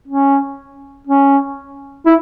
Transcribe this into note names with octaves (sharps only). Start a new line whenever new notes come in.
C#4
C#4
E4